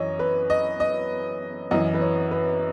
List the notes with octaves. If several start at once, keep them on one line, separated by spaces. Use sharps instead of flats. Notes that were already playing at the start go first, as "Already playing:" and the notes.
Already playing: F#2 E3 C#5 D#5
B4
D#5
D#5
F#2 E3 D#5
B4
C#5
B4